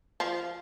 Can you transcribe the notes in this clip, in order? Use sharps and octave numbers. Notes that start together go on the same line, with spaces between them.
F3 F4